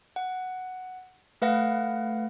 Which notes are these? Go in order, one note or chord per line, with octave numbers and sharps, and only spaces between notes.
F#5
A3 B4 F5 F#5 A#6